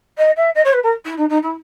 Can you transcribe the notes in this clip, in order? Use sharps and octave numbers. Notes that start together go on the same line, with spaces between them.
D#5
E5
D#5
C#5
B4
A#4
E4
D#4
D#4
E4